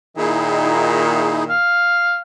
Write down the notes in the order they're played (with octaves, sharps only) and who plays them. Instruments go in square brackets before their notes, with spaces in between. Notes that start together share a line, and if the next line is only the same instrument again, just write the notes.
[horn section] A#2 D#3 [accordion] D#4 E4 G#4
[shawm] F5